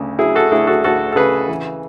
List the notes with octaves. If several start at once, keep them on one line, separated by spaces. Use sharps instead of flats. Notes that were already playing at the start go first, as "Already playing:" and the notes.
Already playing: D2 C#3
F#3 E4 G#4
F#4 A4
D2 E4 G#4
F#4 A4
D2 F#4 A4
A4
C#3 G#4 B4
E3